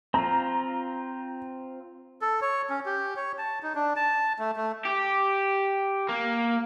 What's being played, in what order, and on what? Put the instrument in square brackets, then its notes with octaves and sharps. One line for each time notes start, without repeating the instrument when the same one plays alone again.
[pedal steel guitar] C4 F4 [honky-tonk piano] A#5
[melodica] A4
C#5
C#4
G4
C#5
A5
D#4
D4
A5
A3
A3
[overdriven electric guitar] G4
A#3